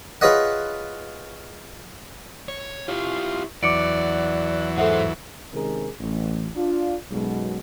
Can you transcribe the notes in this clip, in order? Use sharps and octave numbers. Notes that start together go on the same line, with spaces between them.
F4 G#4 B4 C#5 D#5 F#5
C#5
E4 F4 G4
E2 E3 F#3 D5 D6 C#7 D7
G#2 G#4 A4 C5 E5 F#5
C3 D#3 G#3 C#4 G#4 A#4
A1
D4 F4
B1 F#2 B2 F#3 G#3